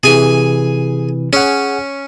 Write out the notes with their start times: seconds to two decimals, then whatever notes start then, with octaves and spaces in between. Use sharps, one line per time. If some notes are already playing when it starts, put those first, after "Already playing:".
0.03 C3 E3 G#4 G#5
1.33 C#4 G#4 F#5